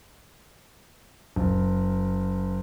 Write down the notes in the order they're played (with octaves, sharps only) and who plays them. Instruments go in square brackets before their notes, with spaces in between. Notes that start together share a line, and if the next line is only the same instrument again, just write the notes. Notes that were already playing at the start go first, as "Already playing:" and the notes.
[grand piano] F#1